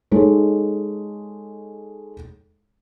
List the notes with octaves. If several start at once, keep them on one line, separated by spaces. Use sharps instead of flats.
G#3 D#4 A4 C#5